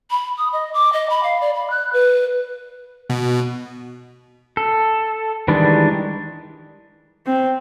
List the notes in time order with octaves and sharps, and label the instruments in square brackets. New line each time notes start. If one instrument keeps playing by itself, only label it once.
[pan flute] B5
D#6
D#5
D6
D#5
B5
F5
D5
B5
F#6
B4
[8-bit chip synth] B2
[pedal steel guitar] A4
D#3 E3 G3 G#3 D4
[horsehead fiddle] C4